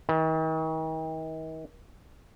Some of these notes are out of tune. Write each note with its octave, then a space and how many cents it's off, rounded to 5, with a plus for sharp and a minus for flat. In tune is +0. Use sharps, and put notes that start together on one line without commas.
D#3 +40